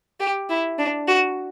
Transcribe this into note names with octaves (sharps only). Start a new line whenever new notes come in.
G4
E4
D4
F#4